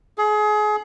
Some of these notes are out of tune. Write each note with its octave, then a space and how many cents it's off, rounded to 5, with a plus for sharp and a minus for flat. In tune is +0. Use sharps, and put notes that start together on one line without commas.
G#4 +30